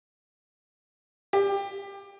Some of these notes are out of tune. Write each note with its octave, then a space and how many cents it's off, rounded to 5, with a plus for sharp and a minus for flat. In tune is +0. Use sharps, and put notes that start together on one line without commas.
G4 +20